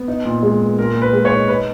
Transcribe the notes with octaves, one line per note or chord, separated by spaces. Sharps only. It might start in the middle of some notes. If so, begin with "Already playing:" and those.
Already playing: B3
D#4
A#2
G#3
B3
A#2 A#4
A#2
B4
G#3
C#5
D#4
D#4 B4